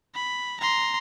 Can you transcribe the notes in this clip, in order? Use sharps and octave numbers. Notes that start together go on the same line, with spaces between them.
B5
A#5 C6